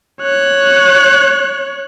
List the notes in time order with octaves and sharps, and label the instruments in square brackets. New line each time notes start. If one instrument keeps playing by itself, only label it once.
[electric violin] C#5 F#6